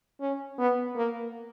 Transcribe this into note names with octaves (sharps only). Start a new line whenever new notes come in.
C#4
B3
A#3